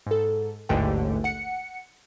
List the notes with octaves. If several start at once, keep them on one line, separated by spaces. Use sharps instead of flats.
G#2 A4
A1 D#2 G#2 D3 A3 G5
F#5 C#7